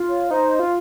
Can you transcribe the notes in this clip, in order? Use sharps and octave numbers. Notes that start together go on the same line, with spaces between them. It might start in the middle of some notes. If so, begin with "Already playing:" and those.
Already playing: F4
C#5
D#4 C5
F4